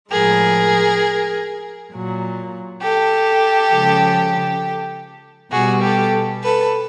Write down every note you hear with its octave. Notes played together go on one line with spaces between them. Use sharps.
A2 F3 G#3 G#4 A#4
A#2 F#3
G4 A4
C#3 F3 G#3
B2 G3 F#4 G#4
G4 A4
A4 B4